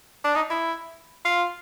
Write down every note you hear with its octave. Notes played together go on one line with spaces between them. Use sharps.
D4
D#4
E4
F4